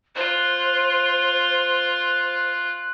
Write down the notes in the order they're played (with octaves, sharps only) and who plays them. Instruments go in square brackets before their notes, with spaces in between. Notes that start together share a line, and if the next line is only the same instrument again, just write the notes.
[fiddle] F4 [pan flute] C5 [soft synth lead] F#6